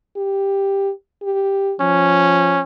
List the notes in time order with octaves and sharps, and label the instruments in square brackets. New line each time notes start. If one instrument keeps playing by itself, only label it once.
[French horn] G4
G4
[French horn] F3 [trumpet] C#4